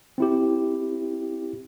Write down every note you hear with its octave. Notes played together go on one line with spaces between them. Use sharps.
C4 E4 G4